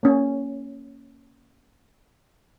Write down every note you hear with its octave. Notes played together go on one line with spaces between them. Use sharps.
A#3 C#4